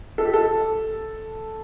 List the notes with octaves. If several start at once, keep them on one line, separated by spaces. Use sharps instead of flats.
A4
G4
A4